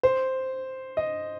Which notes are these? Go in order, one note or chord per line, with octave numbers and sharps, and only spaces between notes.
C5
D#5